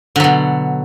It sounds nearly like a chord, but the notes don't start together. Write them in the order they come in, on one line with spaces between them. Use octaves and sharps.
D3 F#3 B2